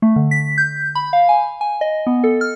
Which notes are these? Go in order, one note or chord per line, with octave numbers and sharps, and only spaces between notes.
A3
D3
B6
G6
B5
F5
G#5
G#5
D#5
B3
A4
F6